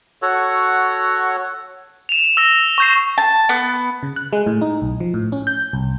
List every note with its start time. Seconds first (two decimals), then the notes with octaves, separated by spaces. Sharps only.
0.22 F#4 A4 C#5 F#5
2.09 E7 F7
2.37 E6 A#6
2.78 C#6 G6 C7
3.18 A5
3.49 B3
4.03 C#3
4.16 F#6
4.33 G#3
4.46 A2
4.62 D#4
4.82 B1
5.00 F3
5.14 A2
5.32 C#4
5.47 G6
5.73 C2